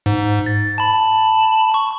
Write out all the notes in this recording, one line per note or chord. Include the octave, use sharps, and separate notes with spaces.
G#2
A6
A5 B5
C#6